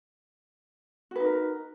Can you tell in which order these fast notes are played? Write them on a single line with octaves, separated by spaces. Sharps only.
F#4 B4 D#4 A#4